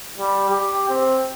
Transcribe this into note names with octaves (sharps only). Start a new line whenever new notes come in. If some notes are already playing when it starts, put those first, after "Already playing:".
G3
G4
C4